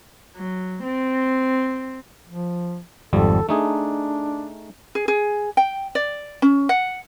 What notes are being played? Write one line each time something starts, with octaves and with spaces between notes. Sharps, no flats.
F#3
C4
F3
G#1 F2 G3 A4
A3 D4 D#4 G#4
G#4
G#4
G5
D5
C#4
F#5